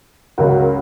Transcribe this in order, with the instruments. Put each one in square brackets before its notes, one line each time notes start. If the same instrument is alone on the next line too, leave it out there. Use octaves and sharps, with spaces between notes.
[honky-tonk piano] C#2 C#3 F#3 F#4 A#4